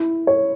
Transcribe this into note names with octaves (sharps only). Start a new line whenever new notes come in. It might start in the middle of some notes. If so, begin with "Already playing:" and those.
Already playing: E4
C#5